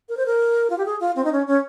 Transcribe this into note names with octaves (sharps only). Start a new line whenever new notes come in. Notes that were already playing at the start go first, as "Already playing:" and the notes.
A#4
C5
A#4
F4
G4
G#4
F4
C4
D#4
C#4
C#4